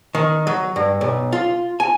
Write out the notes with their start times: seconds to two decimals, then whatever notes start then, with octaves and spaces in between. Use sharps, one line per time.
0.15 D#3
0.47 F#3
0.76 G2
1.01 B1
1.32 F4
1.80 G#5